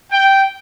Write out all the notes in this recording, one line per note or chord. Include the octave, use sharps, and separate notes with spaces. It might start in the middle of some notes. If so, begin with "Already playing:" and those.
G5